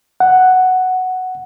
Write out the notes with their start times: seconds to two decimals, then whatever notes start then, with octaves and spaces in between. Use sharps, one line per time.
0.20 F#5